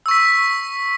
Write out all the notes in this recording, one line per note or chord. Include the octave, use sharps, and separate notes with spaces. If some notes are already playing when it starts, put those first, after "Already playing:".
C#6 E6 B6